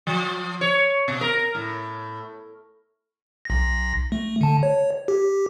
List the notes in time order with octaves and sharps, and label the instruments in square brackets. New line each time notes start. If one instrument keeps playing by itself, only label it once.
[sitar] F3
C#5
B2
A#4
A2
[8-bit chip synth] B1 A#6
A3
D3 A5
C#5
G4